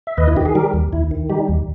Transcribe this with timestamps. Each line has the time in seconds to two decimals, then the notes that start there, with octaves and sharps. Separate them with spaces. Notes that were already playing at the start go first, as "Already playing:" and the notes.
0.07 E5
0.17 D#2 B4 D#5
0.27 E4
0.37 D#3 G4
0.45 G#4
0.55 G3 G4 A#4
0.74 D#2
0.93 D#2 E4
1.11 D#3
1.29 G3 D#4 G4
1.48 D#2